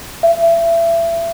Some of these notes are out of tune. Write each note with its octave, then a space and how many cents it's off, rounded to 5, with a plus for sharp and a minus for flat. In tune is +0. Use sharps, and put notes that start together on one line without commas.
E5 +30